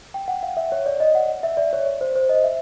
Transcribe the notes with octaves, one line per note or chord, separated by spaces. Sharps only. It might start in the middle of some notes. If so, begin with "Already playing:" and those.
G5
F#5
F5
E5
C#5
D5
D#5
F#5
E5
D5
C#5
C5
C5
D#5
E5